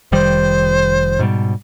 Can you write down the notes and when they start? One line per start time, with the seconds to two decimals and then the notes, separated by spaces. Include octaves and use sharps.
0.12 F1 D#3 G3 C5
1.19 G#2 B2 G3